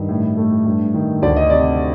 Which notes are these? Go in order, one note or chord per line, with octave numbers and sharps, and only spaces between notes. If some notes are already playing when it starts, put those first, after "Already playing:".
Already playing: G2 D#3
A2
A3
G2
D#3
D2 D5
D#5
C3 D5